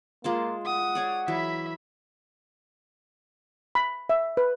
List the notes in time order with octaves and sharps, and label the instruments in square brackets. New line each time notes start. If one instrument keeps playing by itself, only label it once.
[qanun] G#3 F4 A5 [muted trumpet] A#3
[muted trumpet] F#5 [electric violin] D#6
[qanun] G#4 C#5 D5
[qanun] E3 F#3 [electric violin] E5 B5
[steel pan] B5
E5
B4